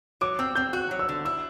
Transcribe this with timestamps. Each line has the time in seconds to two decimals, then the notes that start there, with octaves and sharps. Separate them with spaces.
0.21 F#3 D6
0.39 C4 E6
0.55 C4 G6
0.73 F#4 F#6
0.91 F#3
0.99 E6
1.09 D3
1.25 E4 E6